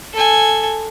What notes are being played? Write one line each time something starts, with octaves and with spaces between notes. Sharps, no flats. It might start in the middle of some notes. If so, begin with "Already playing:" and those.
A4 G#5